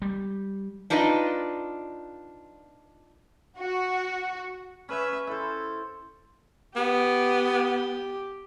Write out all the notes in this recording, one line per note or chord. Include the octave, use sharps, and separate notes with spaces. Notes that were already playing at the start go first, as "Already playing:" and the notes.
G3
D4 D#4 F4 B4 D5 D#5
F#4
C#4 B4 C#5 E5
E4 A4 C5
B3 G4